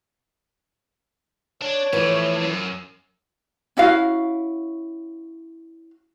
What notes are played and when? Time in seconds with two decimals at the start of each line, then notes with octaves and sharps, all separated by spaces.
1.62 D4 C#5
1.93 A2 E3 F3 A3
2.42 F#2
3.77 C#4 E4 F#4 F5